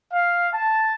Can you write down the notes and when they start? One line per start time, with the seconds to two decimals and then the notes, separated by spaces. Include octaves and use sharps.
0.12 F5
0.53 A5